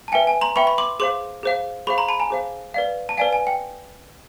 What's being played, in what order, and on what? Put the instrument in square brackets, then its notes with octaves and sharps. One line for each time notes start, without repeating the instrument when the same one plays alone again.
[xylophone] A5
B4 E5 G5 G#5
G#5
A#5 C6
B4 E5 G5 B5 C#6
B5 C#6
C6 D6
G#4 C5 F5 C6 D6
G#4 C5 F5
G#4 C5 F5 B5 C#6
A#5 C6
A5 B5
G#5 A#5
G#4 C5 F5
B4 D5 F5
A5
B4 D5 F5 G#5
G#5
G5